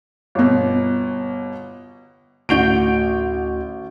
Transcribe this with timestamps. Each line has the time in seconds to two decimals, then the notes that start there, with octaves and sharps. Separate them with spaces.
0.35 G1 B2
2.49 A1 D2 F#4 G6 D7